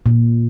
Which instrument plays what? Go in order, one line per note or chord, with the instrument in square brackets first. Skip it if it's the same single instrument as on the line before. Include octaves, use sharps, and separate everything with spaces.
[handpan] A#2